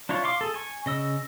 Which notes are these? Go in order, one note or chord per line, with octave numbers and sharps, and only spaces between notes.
D4 E4 F4 C#5
F5 C6 D6
G#4 A4
G#5 C#6
C#3 D#5 E6